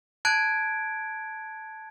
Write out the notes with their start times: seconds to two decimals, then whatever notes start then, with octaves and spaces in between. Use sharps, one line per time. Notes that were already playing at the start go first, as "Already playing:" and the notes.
0.25 A5 F#6 G#6 D7